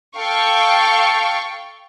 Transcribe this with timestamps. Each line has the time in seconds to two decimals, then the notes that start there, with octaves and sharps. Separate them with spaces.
0.17 A4 F5 G5 C#6